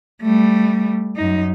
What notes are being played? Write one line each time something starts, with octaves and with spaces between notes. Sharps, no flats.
G3 A3
F#2 D#4